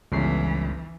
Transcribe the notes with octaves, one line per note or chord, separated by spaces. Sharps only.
G1 C#2 E3 C#4 C7